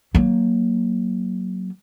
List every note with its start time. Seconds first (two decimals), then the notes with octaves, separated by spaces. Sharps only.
0.15 F#3 A#3